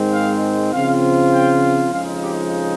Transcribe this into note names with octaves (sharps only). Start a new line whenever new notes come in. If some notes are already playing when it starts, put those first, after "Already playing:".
Already playing: G#2 D#3 G#3 C4
F5
C#3 F3 C4 F4 F5
G5
F2 C#3 F3 G#3 D#4 F5
G4